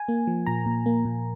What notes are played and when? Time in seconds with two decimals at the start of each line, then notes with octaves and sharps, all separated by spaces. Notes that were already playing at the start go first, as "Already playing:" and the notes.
Already playing: G#5
0.08 A#3
0.27 F3
0.46 A#2 A#5
0.66 A#2
0.86 A#3
1.05 A#2